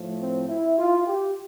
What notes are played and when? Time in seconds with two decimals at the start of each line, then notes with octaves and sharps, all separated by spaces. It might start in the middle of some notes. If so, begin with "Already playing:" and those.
Already playing: A2 F3 A3
0.19 C4
0.48 E4
0.78 F4
1.07 G4